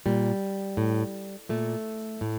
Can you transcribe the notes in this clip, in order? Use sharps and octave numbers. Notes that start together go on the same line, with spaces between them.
A#2 G3
A2
A#2 A3
A2